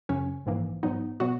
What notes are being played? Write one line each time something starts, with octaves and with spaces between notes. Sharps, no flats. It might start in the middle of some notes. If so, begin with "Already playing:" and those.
F#2 C#3 F#3 C#4
A#1 G#2 E3 A#3
G#2 F#3 B3 D#4
B2 F#3 B3 F#4